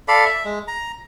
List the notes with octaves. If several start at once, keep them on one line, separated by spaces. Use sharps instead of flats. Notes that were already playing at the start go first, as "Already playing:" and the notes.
A4 D5 F5 B5
E5
G#3
A#5